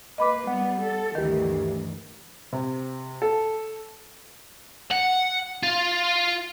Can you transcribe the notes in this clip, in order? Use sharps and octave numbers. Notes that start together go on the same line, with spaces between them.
A#3 B4 D#5 B5 D6
G3 B3 F#5
A4
D2 G2 D#3 E3 G4 A#4
C3
A4
F#5
F4